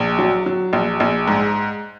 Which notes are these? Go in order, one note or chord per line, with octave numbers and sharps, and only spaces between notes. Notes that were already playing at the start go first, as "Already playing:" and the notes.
Already playing: A#1
F#3
F#3
A#1
A#1
G#2